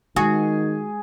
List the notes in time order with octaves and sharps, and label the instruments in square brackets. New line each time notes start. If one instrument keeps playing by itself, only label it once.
[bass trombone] D#3 [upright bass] G#3 [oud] F#4 [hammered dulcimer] G#4